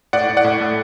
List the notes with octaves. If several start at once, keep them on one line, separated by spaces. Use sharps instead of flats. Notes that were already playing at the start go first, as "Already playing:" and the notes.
A2 D5 F#5
A2
D5 F#5
A2
A3